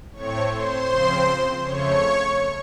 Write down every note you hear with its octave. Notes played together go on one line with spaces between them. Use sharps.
A2 A3 C4 C#5 C#6
C5 C6
C#3 F3 C4
F2 C#3 A3 C#5 C#6